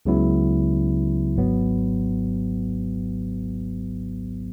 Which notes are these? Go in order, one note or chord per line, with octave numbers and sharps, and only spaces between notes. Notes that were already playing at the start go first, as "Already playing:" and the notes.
C#2 C#3 F#3 B3 E4
G#1 G#2 F#3 B3